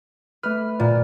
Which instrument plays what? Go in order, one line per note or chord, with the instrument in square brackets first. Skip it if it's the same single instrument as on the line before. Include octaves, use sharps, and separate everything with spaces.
[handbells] A3 F6 [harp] B4
[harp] A#2 [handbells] D5